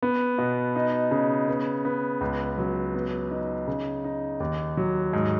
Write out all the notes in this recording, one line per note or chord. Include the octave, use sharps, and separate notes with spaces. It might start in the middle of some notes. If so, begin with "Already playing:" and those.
B3
B2
D#4
C#3
B3
B3
C#2
F#3
B3
D#4
C#3
D#4
D#2
F#3
G#2